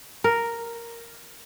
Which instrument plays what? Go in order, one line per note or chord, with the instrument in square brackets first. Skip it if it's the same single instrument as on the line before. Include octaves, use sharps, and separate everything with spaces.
[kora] A#4